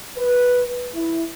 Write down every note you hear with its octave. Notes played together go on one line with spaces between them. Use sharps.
B4
E4